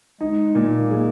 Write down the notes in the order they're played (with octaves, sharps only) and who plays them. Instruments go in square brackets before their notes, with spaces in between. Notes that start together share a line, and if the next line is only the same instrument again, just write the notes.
[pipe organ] G#3 [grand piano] D#4
[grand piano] A#2 [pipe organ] A#3
[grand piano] G#3